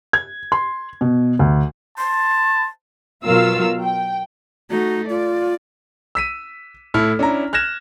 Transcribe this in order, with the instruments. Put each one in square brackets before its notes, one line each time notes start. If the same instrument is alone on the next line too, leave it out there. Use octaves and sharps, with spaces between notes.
[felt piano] G#6
C6
B2
D2
[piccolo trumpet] A5 [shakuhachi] C6
[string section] B2 F#3 F4 A#4 F5 E6
G5
[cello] A3 D#4 [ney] F#4
[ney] F4 [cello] D5
[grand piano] E6 B6 D#7
A2 E4 A4 F6
C#4 D4 E4 A#5
F6 F#6 G#6 A#6 E7